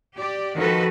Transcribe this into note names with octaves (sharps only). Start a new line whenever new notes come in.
G4 D5
D#3 F3 F#4 A4 B4